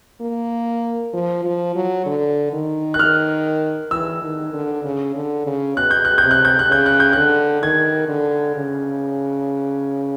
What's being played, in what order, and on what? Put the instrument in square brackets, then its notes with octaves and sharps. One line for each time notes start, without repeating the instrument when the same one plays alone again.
[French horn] A#3
F3
F3
F#3
D3
D#3
[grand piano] F#6
[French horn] D#3 [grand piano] F6
[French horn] E3 [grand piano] E6
[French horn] D#3
D3
C#3
D3
C#3
[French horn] B2 [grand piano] F#6
[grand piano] G6
F#6
G6
[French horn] C3
[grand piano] F#6
G6
F#6
[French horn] C#3 [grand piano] G6
[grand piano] F#6
G6
[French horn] D3 [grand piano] F#6
[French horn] D#3 [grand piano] G#6
[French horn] D3
C#3